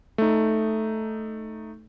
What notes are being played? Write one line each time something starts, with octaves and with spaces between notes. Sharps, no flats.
A3 D#4